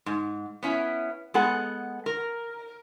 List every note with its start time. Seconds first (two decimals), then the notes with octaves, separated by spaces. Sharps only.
0.06 G#2
0.63 B3 C#4 E4
1.34 G#3 B3 G#4 A4 F#5
2.06 A#4